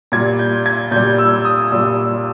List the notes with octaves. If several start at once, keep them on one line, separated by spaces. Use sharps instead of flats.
A#2 G3 G#6
G6
G#6
A#2 G3 G6
E6
E6
D#6
A#2 G3 E6